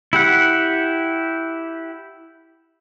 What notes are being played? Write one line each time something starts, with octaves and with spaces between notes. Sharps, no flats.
E4 G4 F#5